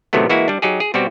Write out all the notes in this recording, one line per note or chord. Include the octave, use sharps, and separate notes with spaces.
A2 C3 D#3 F#3 A3 B3
E3 G#3 A#3 E4 F#4
G3 D4
F#3 D#4 G4 G#4
G#4
B2 G3 C4 F#4 G4